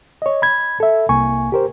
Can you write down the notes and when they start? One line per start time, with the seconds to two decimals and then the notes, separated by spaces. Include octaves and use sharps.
0.22 C#5 D#5
0.42 B5 G#6
0.80 A4 E5
1.09 C2 A#3 G#5 C#6
1.52 G4 A#4 C5